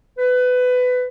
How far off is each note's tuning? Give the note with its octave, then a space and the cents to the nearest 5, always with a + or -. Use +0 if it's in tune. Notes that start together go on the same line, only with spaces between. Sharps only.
B4 +20